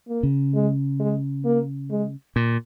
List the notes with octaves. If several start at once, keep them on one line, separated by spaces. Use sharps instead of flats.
A#3
C#3
G#3
G#3
A#3
G#3
A#2